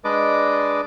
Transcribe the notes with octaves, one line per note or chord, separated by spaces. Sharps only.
G#3 D4 B4 D5 D#5 D6